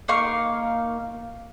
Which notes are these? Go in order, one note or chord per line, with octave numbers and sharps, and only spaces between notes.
A#3 D#4 F5 C#6